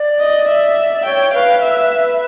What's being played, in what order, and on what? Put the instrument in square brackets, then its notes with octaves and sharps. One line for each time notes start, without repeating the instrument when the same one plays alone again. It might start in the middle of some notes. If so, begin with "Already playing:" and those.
Already playing: [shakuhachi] D5
[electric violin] D#5
E5
[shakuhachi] C#5 [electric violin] G5
[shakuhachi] B4 [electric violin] F5
[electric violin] E5